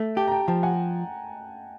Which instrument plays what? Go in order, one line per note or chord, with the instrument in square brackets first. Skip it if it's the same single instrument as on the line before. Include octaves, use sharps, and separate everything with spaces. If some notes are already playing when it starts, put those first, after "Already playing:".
Already playing: [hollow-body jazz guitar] A3
[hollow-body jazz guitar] G4 [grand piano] G5 A5
[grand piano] A#5
G5 A5
[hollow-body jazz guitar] F3 [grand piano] G5 A5
[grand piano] F#5 G#5